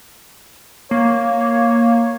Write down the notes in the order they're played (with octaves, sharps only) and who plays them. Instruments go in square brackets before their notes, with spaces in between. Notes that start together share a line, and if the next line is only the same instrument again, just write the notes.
[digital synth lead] A#3 [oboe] C#5